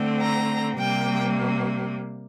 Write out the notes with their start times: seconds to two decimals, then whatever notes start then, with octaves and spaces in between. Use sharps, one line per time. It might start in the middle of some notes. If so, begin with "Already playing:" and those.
Already playing: D3 A3 C4
0.20 A#5
0.78 C3 G3 A#3 G5